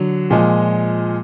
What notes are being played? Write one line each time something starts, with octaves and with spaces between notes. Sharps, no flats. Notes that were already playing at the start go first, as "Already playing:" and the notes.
Already playing: D3 F#3
A#2 F3 G#3